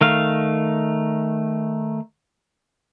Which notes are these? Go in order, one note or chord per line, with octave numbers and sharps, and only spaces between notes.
D#3 A3 F5